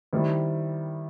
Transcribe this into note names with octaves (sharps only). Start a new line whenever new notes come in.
D#3 G3 C4 E4